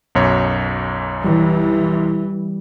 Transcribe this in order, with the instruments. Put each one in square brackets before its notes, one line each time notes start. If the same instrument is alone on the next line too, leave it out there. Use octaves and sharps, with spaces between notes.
[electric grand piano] B1 F#2 C#5
[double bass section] E3 [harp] G3